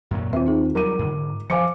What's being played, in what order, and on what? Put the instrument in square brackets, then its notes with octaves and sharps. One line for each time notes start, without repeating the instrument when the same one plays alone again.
[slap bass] F#2 A#2 F#3
[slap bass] D#2 [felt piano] C4 [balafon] F4 E5
[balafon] D#4 G#4
[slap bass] F#3 G3 [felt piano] A#4 D6 D#7
[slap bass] G#2 D3
[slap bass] F3 [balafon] C5 F5 [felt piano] G#5 D6 C#7